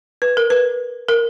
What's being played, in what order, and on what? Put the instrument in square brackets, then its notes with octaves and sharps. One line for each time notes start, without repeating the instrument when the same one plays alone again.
[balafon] B4
A#4
B4
A#4